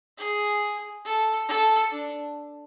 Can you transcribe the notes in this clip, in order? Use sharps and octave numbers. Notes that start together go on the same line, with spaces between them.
G#4
A4
A4
D4